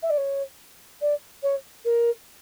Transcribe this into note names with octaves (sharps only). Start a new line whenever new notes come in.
E5
D5
C#5
D5
C#5
A#4